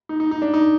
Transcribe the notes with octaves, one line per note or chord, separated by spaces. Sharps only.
D#4
D#4
D#4
D4
D#4